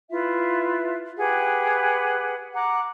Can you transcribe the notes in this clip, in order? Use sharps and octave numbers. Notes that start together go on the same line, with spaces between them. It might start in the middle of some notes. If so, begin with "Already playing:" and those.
E4 F4 B4 E5
G4 G#4 B4 F#5
F#5 A#5 D6